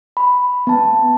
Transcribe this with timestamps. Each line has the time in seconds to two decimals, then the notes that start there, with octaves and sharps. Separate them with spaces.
0.17 B5
0.67 B3 A5